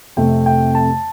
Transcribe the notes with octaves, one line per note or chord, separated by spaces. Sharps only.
F2 C3 A3 G5
G5
A5